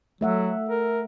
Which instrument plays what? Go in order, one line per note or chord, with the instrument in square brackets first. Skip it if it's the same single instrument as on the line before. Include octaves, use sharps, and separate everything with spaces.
[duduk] F#3 [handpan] A3 E5 F#5
[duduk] A#4